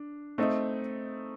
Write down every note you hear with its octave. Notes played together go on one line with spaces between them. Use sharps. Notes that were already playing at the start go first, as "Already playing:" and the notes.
Already playing: D4
A3 C4 D#4